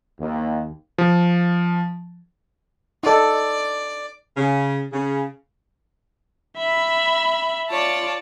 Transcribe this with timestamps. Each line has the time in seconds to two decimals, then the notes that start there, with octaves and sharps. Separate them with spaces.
0.18 D#2
0.98 F3
3.03 D#4 A4 D5
4.37 C#3
4.93 C#3
6.58 E5 B5
7.69 F4 C#5 D5 A5